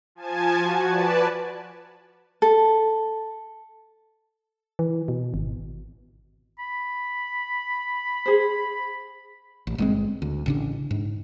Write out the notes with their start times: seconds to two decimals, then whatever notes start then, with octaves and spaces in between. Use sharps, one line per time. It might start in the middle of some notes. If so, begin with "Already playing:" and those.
0.15 F3 G#5 A5 G#6
0.59 F#4
0.89 B4 D5 A5
2.42 A4
4.79 E3
5.08 B2
5.34 G#1
6.59 B5
8.26 G#4 C5
9.67 A1
9.78 G1 G#3 C4
10.22 D2
10.46 A1 C#3 D4
10.91 G#2